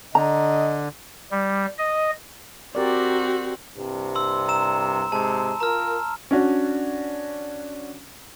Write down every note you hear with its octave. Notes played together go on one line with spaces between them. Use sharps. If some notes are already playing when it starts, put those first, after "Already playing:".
D3 D#5 A#5
G3
D#5
C4 F#4 G4 A#4 D5
C2 G2 C3
C6 E6
A#5 E6 E7
G#2 C3 G#3 A5
F4 A#4 A#5 F6
C#4 D4 F#4